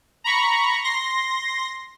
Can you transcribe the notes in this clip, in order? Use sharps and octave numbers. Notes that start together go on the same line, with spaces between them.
A#5 B5 C#6
C6 A#6